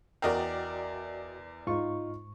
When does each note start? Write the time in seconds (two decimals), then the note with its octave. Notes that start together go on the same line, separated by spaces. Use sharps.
0.22 E2 F#4 A#4 D5 D#5 G5
1.67 G#2 D#4 F4 C#6